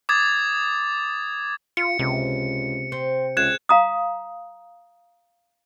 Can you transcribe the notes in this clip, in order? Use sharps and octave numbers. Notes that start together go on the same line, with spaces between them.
D6 D#6 G#6 A6
F4 C#7
C#2 C3
C4
C#2 G#4 F#6 G#6 E7
F5 A#5 D#6